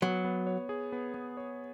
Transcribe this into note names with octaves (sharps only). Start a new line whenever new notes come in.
F#3 B3
B3
C#5
G#4
B3
B3
C#5